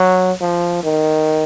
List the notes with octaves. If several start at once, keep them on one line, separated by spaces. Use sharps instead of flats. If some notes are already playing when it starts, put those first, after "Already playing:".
Already playing: F#3
F3
D#3